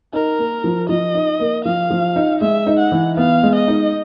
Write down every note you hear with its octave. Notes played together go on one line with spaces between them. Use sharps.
D#4 A#4
A#3
F3
F3 D#5
D#4
A#3
F3 F5
F3
D#4
G#3 E5
D#4
F#5
E3
B3 F5
G#3
D#5
D#4